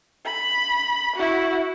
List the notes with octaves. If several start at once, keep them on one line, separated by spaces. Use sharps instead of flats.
B5
E4 F#4